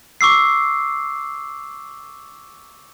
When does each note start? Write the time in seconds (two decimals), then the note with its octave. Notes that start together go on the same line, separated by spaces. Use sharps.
0.21 C#6 D6 E6 C7